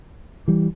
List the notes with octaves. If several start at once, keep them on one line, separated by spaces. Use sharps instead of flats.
E3 G3